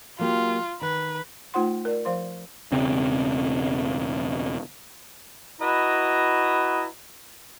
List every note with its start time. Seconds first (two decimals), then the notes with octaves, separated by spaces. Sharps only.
0.19 F#3 A#3 F4 G4
0.81 D#3 B4
1.54 A3 D#4 F4 C5 F#5 C6
1.85 A#4 D5
2.05 F3 C5 F5 C6
2.72 E1 C#3 C4
5.61 E4 F#4 B4 D#5 A#5